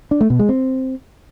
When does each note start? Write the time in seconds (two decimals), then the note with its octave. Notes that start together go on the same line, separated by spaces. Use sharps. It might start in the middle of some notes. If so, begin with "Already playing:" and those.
0.11 D4
0.21 A3
0.30 B2
0.39 G#3
0.49 C4